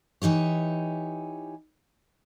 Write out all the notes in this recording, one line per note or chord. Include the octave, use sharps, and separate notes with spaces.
E3 D#4 G4 C#5